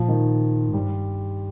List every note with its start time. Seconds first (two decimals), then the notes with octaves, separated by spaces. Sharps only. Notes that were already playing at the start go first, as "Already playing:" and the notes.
Already playing: A#2 F3
0.08 D#3
0.69 G#2
0.74 G2 G3